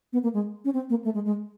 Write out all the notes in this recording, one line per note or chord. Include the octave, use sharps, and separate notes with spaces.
B3
A#3
G#3
C#4
C4
A#3
A3
G#3
G#3